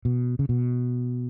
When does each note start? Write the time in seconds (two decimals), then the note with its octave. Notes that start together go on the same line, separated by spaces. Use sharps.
0.05 B2
0.39 C#3
0.49 B2